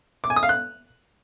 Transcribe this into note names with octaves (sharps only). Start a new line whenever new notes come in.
D6
G#5
D#6
F5
F#6